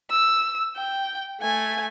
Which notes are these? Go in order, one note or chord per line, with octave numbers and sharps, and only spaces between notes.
E6
G5
A3 G#5